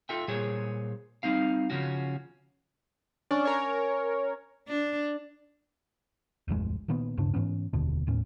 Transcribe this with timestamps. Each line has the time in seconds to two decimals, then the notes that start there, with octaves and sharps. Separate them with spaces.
0.09 F4 A4 E5 G5
0.28 A#2 G3 G#4 C5 C#5
1.23 G3 C4 D#4 F5
1.70 C#3 F3 C#4 F#4
3.31 C#4 D4
3.45 A#4 C#5
4.68 D4
6.48 D1 A1 F2 G#3
6.88 A#2 D#3 A#3 B3
7.17 D1 G2 C#3 D4
7.34 G#2 E3 B3 C#4
7.73 F1 D#2 B2 D3
8.07 D#2 A2 C#4